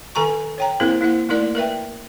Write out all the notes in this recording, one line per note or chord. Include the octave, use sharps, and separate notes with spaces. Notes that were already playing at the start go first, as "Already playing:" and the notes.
D#3 A4 G#5 A#5 C#6
C#5 G5 A#5
A#3 C4 E4 G#4 A#4 C5
A#3 E4 C5 F#5
A3 A#3 D#4 E4 A#4 D5
A#4 B4 E5 G5